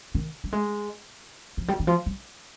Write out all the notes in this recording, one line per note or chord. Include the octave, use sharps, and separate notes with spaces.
D#3
G3
G#3
F3
G3
D#3
F3
G3